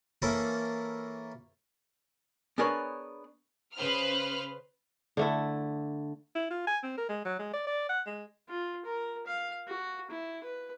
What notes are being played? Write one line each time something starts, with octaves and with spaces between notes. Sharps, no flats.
E3 A#3 C#4 E4 A4 A#4
B3 D4 G#4 A#4 B4 C#5
C#3 B4 C5 F6
D3 A3 E4
E4
F4
G#5
C4
A#4
G#3
F#3
G#3
D5
D5
F#5
G#3
F4
A#4
F5
F#4
E4
B4